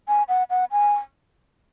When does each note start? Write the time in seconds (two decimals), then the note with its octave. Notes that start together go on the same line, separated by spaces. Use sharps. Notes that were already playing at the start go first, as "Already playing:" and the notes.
0.08 G#5
0.29 F#5
0.50 F#5
0.71 G#5